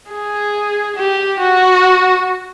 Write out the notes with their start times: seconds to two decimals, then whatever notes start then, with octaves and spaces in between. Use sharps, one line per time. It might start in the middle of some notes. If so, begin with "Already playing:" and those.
0.11 G#4
0.96 G4
1.40 F#4